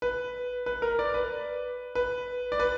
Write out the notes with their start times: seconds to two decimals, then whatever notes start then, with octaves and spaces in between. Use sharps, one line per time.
0.02 B4
0.66 B4
0.82 A#4
0.99 D5
1.14 B4
1.95 B4
2.52 D5
2.60 B4